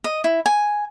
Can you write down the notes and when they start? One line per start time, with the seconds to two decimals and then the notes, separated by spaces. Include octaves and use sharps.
0.04 D#5
0.24 E4
0.46 G#5